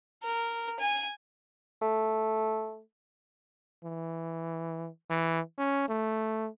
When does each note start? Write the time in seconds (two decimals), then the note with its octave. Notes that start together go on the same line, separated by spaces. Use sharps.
0.23 A#4
0.79 G#5
1.82 A3
3.85 E3
5.10 E3
5.58 C#4
5.89 A3